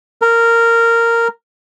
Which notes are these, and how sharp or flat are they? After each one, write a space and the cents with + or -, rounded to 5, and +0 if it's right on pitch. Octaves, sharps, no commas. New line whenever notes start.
A#4 -10